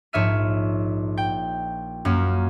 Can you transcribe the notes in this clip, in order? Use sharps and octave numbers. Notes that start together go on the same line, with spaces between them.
A#1 G#2 C#5 E5 F6 D#7
G5
F#2 A#3 C#4